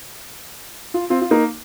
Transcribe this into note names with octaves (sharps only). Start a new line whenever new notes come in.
F4
C4 F4
F4
A#3 D#4